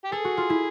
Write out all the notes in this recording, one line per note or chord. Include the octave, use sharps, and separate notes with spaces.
G4
G#4 A4
F#4
F4
E4